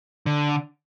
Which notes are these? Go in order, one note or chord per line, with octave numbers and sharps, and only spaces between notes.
D3